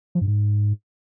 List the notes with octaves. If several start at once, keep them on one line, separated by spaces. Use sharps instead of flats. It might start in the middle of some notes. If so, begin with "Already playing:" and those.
F3
G2
G#2